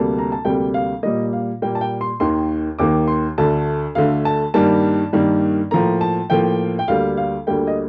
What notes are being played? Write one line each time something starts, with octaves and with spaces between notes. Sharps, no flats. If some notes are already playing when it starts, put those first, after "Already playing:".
Already playing: D2 C3 G3 A#3 A5
A#5
A5
D2 C3 G3 A#3 G5
F5
A#2 G3 A#3 D#5
F5
A#2 G3 A#3 G5
A5
G5
C6
D#2 D#3 A#3 C6
D#2 D#3 A#3 D6
C6
D2 D3 A3 A5
D2 D3 A3 F5
A5
G2 D#3 G3 A#3 A5
G2 D#3 G3 A#3
A2 F3 A#3 A#5
A5
A2 F3 A#3 G5
G5
D2 D3 G3 A#3 F5
F5
D2 D3 G3 A#3 G5
D#5